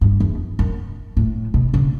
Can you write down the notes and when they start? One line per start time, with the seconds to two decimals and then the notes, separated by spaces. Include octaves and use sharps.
0.01 G2
0.20 E2
0.59 F#2
1.17 A2
1.54 B2
1.74 C#3